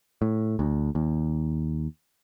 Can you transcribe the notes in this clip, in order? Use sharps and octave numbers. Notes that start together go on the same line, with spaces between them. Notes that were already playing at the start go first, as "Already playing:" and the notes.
A2
D2
D#2